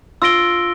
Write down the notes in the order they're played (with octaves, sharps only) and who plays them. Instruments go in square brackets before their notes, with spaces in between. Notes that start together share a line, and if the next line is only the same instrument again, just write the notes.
[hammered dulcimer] F4 [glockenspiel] E6 A#6 D7 G7